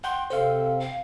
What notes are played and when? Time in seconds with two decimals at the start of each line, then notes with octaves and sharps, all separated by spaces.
0.04 F#5 G5 C6
0.30 C3 C4 A4 C5 F5
0.80 F5